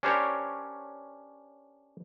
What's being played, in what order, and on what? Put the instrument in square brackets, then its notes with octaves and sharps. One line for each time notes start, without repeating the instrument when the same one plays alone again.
[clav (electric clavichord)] C#4 D4 G4 A#4 C5 C#5